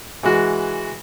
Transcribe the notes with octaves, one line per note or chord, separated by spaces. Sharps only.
E3 G#3 F#4